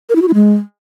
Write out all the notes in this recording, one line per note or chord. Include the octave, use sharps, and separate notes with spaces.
A#4
E4
F#4
E4
G#3